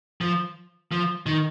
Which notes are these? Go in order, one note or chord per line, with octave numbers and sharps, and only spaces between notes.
F3
F3
D#3